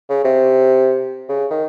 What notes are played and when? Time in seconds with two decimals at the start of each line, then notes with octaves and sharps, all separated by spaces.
0.09 C#3
0.24 C3
1.29 C#3
1.50 D#3